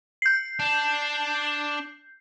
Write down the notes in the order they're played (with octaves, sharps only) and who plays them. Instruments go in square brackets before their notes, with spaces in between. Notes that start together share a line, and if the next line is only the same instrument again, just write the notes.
[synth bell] G6 C7
[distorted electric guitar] D4